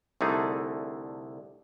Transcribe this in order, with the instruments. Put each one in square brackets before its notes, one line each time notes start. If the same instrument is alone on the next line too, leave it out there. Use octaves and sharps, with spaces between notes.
[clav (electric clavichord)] C2 D3 A3 D#4 G#4